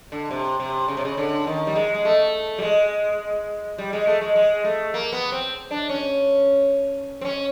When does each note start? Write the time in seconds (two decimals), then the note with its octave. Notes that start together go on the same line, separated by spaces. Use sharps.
0.12 D3
0.31 C3
0.60 C3
0.88 C#3
0.97 C3
1.05 C#3
1.18 D3
1.47 D#3
1.67 G3
1.75 G#3
1.94 G#3
2.05 A3
2.58 G3
2.62 G#3
3.78 G3
3.93 G#3
4.07 A3
4.21 G#3
4.36 G#3
4.65 A3
4.94 A#3
5.13 B3
5.32 C4
5.71 D4
5.89 C#4
7.21 C4
7.25 C#4